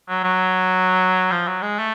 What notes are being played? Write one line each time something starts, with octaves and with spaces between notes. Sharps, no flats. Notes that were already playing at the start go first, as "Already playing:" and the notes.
F#3
F#3
F3
F#3
G#3
A3